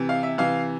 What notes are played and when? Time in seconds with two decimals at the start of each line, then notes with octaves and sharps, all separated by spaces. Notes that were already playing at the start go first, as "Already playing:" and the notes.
Already playing: C3 E3
0.09 F5
0.23 E5
0.38 C3 E3 F5